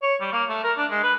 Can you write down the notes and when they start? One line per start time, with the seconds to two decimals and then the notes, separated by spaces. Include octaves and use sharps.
0.02 C#5
0.21 G3
0.32 A#3
0.49 A3
0.64 A#4
0.77 D4
0.90 G#3
1.03 B4